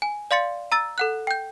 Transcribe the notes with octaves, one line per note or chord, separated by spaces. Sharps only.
G#5
D5 F5 C6 A6 C#7
A#5 E6 A6
A4 F#5 F#6
G5 G6